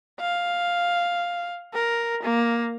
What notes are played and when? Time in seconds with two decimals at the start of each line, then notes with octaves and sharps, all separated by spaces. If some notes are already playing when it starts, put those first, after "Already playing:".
0.20 F5
1.74 A#4
2.23 A#3